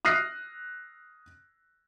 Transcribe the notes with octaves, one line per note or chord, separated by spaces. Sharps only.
D#6 F6 F#6 A#6 C7